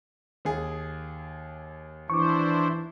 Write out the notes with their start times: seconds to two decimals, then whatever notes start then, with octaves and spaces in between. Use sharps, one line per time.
0.45 D#2 G#4
2.10 E3 D4 E4 C5 C#6 D6